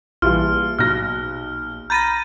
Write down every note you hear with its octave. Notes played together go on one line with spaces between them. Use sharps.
A#1 E3 G3 F4 F6
B1 F6 F#6 A#6
A#5 B5 G6 A6 A#6 D#7